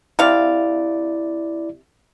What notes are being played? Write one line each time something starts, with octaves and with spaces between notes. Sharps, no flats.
C3 E4 D5 F5